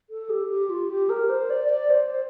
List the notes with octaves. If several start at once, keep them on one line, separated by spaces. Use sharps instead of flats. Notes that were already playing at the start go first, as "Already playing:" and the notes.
A4
G4
G4
F4
G4
A#4
C5
D5
D5
C5